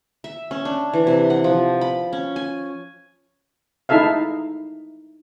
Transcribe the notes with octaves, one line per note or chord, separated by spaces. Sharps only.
E5
C#4
D4
E3
C3
F#5
F3
B5
C#4
G#5
D#4 E4 A4 E5 F5